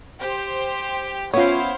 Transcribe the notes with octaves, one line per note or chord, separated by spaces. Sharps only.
G4 C5
B3 C#4 E4 F4 C5 C#5 F5